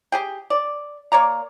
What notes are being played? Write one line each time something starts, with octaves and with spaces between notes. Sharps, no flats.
G4 G#4 G5
D5
A#3 C#5 D5 A#5